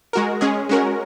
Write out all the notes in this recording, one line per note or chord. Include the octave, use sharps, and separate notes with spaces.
G#3 F#4 A#4
G#3 C#4 G#4
G#3 C#4 F#4 A#4